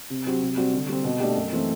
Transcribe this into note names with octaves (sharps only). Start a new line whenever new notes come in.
C3
F#3 C4 G4
C3
G3 C4 F#4
D3
G3 C4
B2
A3 D4 G4
F#2
E3 A3 C4